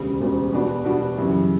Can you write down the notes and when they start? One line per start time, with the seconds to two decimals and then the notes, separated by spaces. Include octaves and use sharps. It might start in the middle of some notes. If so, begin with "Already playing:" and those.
Already playing: E1 D2 C#3 G3
0.20 E1 D2 C#3 G3
0.52 B2 G3 B3 D4 F#4
0.84 B2 G3 B3 D4 F#4
1.17 F#2 C#3 E3 G3